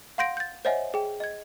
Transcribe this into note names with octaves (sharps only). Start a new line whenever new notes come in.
F5 F#5 C6 G6 A#6 D7
G6 A6
C5 C#5 D#5 E5 F#5 G#5
G#4 G5
D#5 G#6